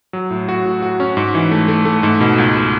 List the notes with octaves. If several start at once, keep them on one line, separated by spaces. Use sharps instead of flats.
F#3
A2
F#4
A2
F#4
C#4
G#2
E3
A3
A3
A3
G#2
B2
C#2